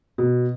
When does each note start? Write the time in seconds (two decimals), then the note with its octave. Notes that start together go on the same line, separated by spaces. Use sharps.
0.18 B2